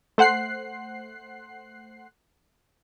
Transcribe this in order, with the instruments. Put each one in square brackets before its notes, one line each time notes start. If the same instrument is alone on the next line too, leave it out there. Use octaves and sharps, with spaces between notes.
[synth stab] A3 C5 F#5 F#6 C7